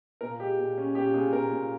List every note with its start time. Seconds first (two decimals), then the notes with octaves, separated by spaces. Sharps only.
0.21 A#2 A#4
0.40 G#3 G4
0.58 A#2
0.78 C#4
0.95 A#2 G4
1.14 A#2 G#4
1.33 A#2 A#4
1.51 A#2